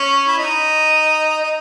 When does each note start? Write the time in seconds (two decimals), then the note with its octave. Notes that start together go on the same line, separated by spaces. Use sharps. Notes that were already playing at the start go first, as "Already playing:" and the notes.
Already playing: C#4
0.27 E4
0.38 D#4
1.42 D#4